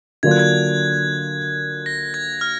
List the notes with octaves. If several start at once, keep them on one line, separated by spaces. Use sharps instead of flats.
D3 F#3 A#3 D4 F4 G#6
F#6
G#6
A#6
G#6
F6